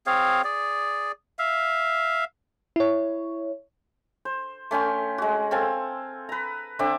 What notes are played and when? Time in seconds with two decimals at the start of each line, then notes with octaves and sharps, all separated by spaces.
0.06 C4 G#4 C#5 F5
0.44 G#4 D5
1.39 E5 F5
2.76 E4 C#5
4.25 C5
4.71 A3 C#4 G5 C6
5.18 G#3 F#4
5.51 C4 A4 F5 G#5
6.29 B4 A#5
6.79 D3 C4 E5 D6